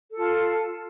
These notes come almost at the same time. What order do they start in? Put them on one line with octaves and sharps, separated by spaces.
A4 F4 A5